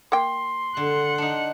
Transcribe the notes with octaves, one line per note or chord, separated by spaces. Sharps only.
A#3 G5 C6
D3 F#5
D4 D#4